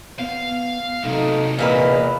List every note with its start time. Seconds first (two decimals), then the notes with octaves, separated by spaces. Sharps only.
0.19 B3 F5
1.04 C3 F#3 A3 D#4 F5
1.59 E2 A#2 A#3 B4 D#5